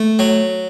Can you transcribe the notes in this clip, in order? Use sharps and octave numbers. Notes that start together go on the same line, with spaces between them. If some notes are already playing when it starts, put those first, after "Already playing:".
Already playing: A3
F#3